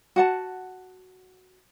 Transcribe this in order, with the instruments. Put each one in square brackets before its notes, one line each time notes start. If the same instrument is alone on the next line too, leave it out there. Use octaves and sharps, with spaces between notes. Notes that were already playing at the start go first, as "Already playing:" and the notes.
[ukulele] F#4 F#5 A5